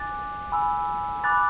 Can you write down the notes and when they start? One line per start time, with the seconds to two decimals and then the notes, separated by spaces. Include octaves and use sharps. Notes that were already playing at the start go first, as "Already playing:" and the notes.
Already playing: G#5 D6 F#6 A6
0.52 G#5 B5 E6
1.24 G#5 B5 D6 F#6 A6